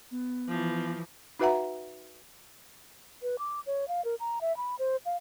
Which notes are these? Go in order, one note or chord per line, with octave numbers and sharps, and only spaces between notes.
B3
E3 F3
D#4 F#4 B4 E5 F#5 A#5
B4
D6
C#5
F5
A#4
A#5
E5
B5
C5
F5